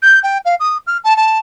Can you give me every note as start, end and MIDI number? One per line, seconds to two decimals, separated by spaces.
0.02 0.19 91
0.23 0.38 79
0.45 0.55 77
0.59 0.77 87
0.87 0.97 89
1.04 1.16 81
1.16 1.38 81